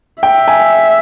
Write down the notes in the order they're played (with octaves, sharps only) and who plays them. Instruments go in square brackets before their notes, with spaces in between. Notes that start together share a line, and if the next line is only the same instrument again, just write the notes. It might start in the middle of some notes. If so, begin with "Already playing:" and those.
[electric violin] E5 [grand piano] G5
[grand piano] G#5